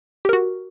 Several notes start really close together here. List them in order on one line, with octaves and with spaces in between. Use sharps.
G4 A#4 F#4